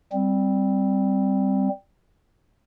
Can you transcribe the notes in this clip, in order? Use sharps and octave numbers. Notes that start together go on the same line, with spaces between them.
G3 C4